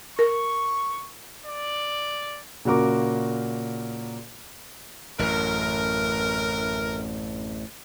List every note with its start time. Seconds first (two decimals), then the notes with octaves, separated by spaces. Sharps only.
0.19 A#4 C#6
1.46 D5
2.65 A#2 C#3 F#4 A#4 D6
5.19 A1 F#2 E3 A3 A#4